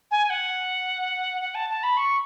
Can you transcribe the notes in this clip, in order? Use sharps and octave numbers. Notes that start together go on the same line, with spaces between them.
G#5
F#5
F#5
A5
A5
B5
C#6